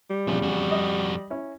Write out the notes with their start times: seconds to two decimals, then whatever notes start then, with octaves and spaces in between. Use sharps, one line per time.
0.10 G3
0.27 E2 A#2 C#3 F3
0.43 F2 F#4
0.71 D#5
1.30 C#4 E4